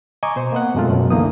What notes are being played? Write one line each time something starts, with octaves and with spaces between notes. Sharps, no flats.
D#5 G#5 A#5 C#6 D6
B2 C5
A#3 B3 D#5 F#5
F#2 B2 G#3 A3 C4 F4
F#2 B2
C2 D3 E3 A#3 D#4 D#6